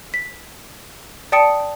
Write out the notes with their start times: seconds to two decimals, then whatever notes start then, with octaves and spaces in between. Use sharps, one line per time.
0.14 B6
1.32 D5 G5 A5 D#6 C#7 D7